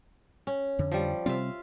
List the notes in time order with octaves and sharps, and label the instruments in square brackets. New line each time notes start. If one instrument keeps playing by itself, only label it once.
[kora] C#4
[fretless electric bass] F2 D3
[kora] F3 G3
[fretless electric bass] C3 G3 C4 [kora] F4 E5